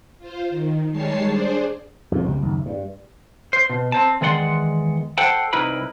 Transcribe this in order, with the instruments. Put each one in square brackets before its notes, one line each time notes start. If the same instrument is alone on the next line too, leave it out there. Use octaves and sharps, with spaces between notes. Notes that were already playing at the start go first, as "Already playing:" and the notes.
[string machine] F4 C5
D#3
D#3 G3 G#3 C#5 A5 C7
D4 G#4 C5 D5
[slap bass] F2 B2 F3
C#2 F3 G3
F#1 D#2
G2
[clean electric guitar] C5
B2
C4 C5 A5
E2 D#3 G#3 D5 F#5 C6
A4 C5 F#5 G5 A5
C2 D#4 E4 A#4 B4 B5